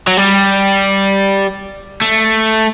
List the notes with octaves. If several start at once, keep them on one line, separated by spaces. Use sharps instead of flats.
F#3
G3
A3